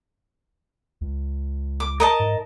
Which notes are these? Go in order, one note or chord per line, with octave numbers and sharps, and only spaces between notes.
C#2
D6
A#4 D#5 A5
G#2